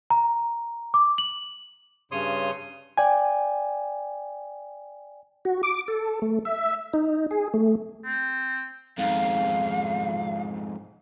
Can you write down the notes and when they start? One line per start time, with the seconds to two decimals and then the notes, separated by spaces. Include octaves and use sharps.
0.10 A#5
0.94 D6
1.18 F#7
2.12 G2 C#3 C#5 C6 D#6
2.98 D5 G5 G#5
5.45 F#4
5.63 D6
5.88 A4
6.22 A3
6.45 E5
6.93 D#4
7.31 G#4
7.54 A3
8.05 C4
8.98 F2 G#2 F5